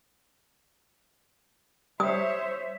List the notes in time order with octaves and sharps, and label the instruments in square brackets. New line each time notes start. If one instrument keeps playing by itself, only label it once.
[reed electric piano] G3 [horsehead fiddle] C5 C#5 [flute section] E5 [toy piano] D#6